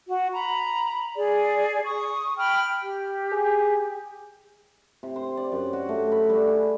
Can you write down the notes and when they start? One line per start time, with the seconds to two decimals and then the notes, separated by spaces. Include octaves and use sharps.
0.07 F#4
0.33 A#5 B5
1.16 G#4 D5
1.84 C#6 D#6
2.37 G5 B5 F6
2.82 G4
3.32 G#4
5.03 C3
5.16 C5
5.37 D5
5.52 F#2
5.73 F#4
5.89 A3
6.12 B5
6.29 G3
6.47 G#4